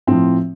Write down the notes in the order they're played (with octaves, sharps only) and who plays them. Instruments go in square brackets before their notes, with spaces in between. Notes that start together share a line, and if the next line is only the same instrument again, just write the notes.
[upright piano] A2 F3 C4